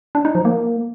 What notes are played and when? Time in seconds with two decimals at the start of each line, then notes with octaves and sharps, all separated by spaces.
0.15 D4
0.25 D#4
0.35 F3
0.45 A#3